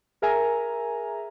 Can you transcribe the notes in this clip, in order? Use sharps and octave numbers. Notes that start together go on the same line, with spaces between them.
G#4 A#4 E5 G#5 A#5